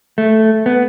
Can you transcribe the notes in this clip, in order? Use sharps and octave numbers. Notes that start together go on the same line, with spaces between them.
A3
B3